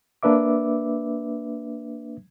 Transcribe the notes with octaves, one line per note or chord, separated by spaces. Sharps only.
A#3 D4 B4 E5 D6